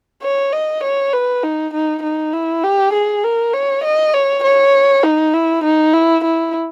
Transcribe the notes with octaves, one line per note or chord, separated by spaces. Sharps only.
C#5
D#5
C#5
B4
D#4
D#4
D#4
E4
G4
G#4
A#4
C#5
D#5
C#5
C#5
D#4
E4
D#4
E4
E4